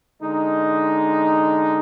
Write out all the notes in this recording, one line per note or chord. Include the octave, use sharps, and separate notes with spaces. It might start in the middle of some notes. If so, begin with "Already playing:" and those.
D3 G#3 D#4